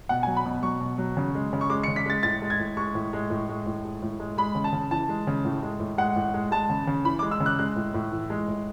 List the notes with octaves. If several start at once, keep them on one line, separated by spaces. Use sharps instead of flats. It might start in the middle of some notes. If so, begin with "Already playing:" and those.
B2 F#5
F#3 G#5
B5
B2
F#3 C#6
B2
F#3
C#3
G#3
C#3
C#6
G#3 D6
C#7
C#3
B6
G#3 A6
A2 A6
G#3
G#6
A2
G#3 C#6
A2
G#3
A2
G#3
A2
G#3
A2
G#3
G#3 B5
C#3
A5
C#3
E3 A5
G#3
C#3
A2
G#3
A2
G#3 F#5
A2
G#3
G#3 A5
C#3
C#3
E3 B5
G#3 D6
E6
C#3
F#6
G#3 F#6
A2
A2
E3
G#3
A2